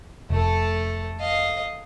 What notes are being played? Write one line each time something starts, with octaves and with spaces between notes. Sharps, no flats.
F1 A3 A4
D#5 F5